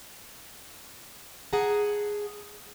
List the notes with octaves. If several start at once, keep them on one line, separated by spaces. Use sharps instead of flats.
G#4 F#5 A5 A#5